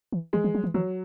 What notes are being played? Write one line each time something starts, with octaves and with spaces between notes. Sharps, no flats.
E3
E3 G#3
E3
F#3
E3
E3 F#3